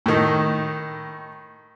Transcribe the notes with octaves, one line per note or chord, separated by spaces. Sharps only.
A2 D#3